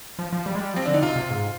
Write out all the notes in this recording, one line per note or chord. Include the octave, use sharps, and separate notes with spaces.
F3
F3
G3
G#3
G3
F3 C4
D3 D4
D#4
C3 F4
C3
G#2